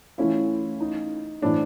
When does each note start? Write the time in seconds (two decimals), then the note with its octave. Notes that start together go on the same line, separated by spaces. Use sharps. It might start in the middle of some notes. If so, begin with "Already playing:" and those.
0.18 E3 A3 C#4 E4 F4
0.81 D#4
1.42 A2 E3 A3 C4 D4